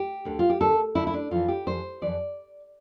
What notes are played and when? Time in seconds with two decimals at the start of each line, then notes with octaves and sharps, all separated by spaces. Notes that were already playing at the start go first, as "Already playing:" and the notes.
Already playing: G4
0.25 D2 D3
0.39 F4
0.50 G4
0.60 D2 D3 A4
0.95 D2 D3 E4
1.07 E4
1.13 D4
1.31 F2 E3 F4
1.48 G4
1.67 F2 E3 C5
2.02 F2 E3 D5